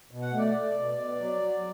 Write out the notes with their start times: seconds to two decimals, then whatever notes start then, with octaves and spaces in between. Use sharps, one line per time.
0.11 B2
0.22 F#5
0.33 A3
0.39 D5
0.54 A3
0.77 B2
0.99 B2
1.20 F#3
1.42 F#3